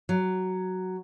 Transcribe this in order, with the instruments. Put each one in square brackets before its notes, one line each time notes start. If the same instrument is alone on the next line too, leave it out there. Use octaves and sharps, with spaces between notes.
[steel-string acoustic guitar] F#3